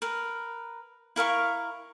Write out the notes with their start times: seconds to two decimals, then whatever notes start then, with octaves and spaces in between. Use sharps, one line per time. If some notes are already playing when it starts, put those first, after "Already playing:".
0.02 A#4 B4
1.16 E4 A#4 F5 C#6